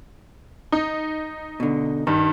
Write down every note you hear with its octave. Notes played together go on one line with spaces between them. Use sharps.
D#4
B2 D3
G2 D#3